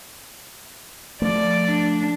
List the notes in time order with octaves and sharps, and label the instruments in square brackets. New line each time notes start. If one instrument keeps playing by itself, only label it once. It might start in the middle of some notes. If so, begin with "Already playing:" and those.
[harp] F3 [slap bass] A3 [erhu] D5
[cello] D4